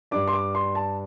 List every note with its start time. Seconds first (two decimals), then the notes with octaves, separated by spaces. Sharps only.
0.11 G2 G3 D4 D6
0.27 C6
0.33 D6
0.55 C6
0.75 A5